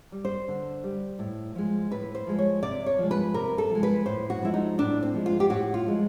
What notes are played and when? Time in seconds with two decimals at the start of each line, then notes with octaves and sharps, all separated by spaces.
0.12 G3
0.25 C5
0.48 D3
0.84 G3
1.19 A2
1.55 F3 G#3
1.91 A2 B4
2.15 C5
2.27 F3 G#3
2.39 C#5
2.63 C3 D5
2.86 C#5
2.98 F3 G#3
3.11 B4
3.34 C3 A#4
3.58 A4
3.70 F3
3.75 G#3
3.83 B4
4.06 A2 C5
4.30 F#4
4.42 F3 G#3 E4
4.54 D#4
4.78 A2 D4
5.03 C4
5.14 F3 G#3
5.26 F4
5.40 G4
5.50 A2 F#4
5.74 F4
5.86 F3 G#3